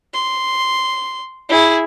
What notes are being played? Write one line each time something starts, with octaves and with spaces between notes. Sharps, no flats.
C6
E4 G#4